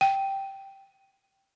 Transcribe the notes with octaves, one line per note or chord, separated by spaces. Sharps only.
G5